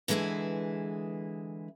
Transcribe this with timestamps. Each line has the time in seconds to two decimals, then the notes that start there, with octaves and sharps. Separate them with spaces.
0.08 D3 E3 G#3 C4 E4 G#4